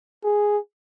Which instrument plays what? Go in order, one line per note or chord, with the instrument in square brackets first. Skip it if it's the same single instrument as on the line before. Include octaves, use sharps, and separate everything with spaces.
[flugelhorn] G#4